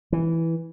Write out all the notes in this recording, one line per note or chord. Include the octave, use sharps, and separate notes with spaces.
E3